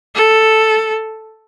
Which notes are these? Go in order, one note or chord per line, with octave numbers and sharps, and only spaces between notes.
A4